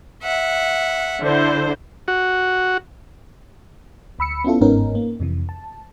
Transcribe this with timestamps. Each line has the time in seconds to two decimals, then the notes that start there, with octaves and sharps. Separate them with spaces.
0.23 E5 F#5
1.23 D3 E4 C5
2.08 F#4
4.19 D2 B5 E6 C#7
4.44 B3 C#4 E4 F4 A4
4.61 G1 G#2 B3 C#4 D#4 A#4
4.95 A#3
5.20 F2 C3 E3
5.49 A5